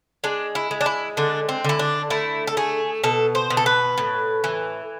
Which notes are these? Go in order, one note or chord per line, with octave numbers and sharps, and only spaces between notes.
G#3 D4
E4
G#3
D4
E4
D3 D4
C4
D3 E4
D4
A3 E4
A4
A3 G#4
B2 A4
C5
B2
A4
B4
A2
E3